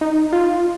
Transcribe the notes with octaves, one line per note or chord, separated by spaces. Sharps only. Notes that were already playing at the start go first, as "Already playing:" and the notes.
D#4
F4